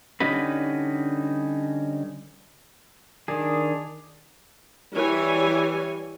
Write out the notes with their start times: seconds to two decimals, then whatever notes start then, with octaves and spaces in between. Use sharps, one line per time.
0.20 D3 G3 C#4 D#4 F#4 B4
3.28 D#3 D4 G#4
4.93 E3 G3 C#5 G#5